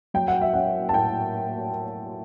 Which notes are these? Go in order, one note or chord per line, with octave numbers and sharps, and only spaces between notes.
F#3 G5
F#5
E5
C#4 F#5
A5
A2 G5